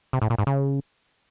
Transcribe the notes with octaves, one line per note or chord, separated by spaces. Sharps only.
C3
A2
A#2
G#2
C#3